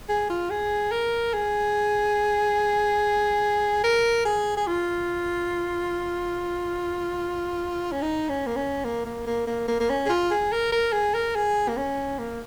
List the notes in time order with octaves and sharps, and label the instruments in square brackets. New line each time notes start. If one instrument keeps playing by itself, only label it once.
[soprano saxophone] G#4
F4
G#4
A#4
G#4
A#4
G#4
G#4
F4
C#4
D#4
C#4
A#3
C#4
A#3
A#3
A#3
A#3
A#3
A#3
C#4
G#4
F4
G#4
A#4
A#4
G#4
A#4
G#4
A#3
C#4
A#3